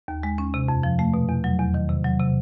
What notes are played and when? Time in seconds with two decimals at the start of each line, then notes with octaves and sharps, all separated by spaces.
0.08 D#2
0.23 G#3
0.38 C#4
0.54 C3
0.68 F2
0.83 F3
0.99 A3
1.14 B2
1.29 E2
1.44 F#3
1.59 E2
1.74 D#3
1.89 C3
2.04 F#3
2.20 C3